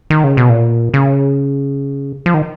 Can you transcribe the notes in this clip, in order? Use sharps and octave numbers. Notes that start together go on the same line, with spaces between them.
D#3
C#3
B2
A#2
C#3
F3
D#3